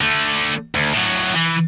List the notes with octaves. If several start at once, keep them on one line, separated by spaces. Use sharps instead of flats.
D3 A3
D2
A2 F#3
E3